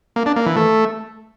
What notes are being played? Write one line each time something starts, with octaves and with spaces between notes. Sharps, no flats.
A#3
D4
A#3
E3
A3